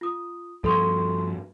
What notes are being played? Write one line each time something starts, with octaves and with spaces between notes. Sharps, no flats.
F4 D#6
G2 F3 A4 C6 C#6